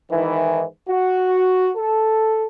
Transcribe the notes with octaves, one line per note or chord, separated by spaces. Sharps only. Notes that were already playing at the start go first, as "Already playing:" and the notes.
G#2 D#3 E3
F#4
A4